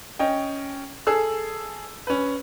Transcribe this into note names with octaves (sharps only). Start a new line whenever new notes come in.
C#4 D#5 G5
G#4 A4 E6
C#4 B4